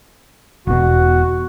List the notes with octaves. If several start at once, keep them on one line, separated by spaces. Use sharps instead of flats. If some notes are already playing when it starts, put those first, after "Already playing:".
E1 B2 F#4